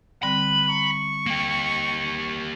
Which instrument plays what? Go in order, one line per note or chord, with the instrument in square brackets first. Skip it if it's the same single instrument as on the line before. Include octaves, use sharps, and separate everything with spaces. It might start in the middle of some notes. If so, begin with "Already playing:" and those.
[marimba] D3 G3 C4 [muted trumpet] B4 [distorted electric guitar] B5
[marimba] A#5 [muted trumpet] C#6
[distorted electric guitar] A#3 G4